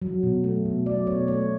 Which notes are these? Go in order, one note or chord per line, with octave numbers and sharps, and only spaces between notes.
F#3
B2
A3
B2
F#3 D5
B2 C#5
A3 C#5